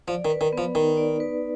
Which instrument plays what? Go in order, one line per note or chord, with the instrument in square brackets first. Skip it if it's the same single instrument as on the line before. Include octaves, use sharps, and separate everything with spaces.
[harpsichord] F3 [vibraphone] D5
[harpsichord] D#3
[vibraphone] B4
[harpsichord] D#3
[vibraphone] B3
[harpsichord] F3
[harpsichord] D#3 [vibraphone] D#4
[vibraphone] D5
B4